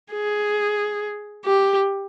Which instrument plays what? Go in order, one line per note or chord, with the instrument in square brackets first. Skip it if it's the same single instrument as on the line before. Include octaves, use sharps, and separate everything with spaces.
[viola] G#4
G4